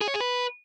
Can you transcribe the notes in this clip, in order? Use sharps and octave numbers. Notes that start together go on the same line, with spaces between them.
G#4
C#5
G#4
B4